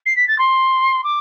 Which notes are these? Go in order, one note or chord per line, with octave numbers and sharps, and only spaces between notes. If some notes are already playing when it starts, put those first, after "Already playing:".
C7
B6
A6
C6
D6